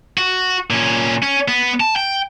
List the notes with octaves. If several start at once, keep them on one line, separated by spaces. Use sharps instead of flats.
F#4
A#2 C#4
C#4
B3
A5
G5